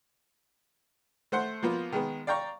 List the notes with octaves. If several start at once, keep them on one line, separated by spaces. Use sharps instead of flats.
A3 C5 F#5 C6
F3 A#3 B3 F4
D#3 G#3 B3
D5 F5 G5 A#5 C#6